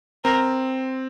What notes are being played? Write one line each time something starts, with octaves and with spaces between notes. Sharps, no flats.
C4 A#4